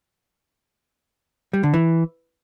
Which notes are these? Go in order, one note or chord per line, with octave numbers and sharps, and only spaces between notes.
G3
D3
E3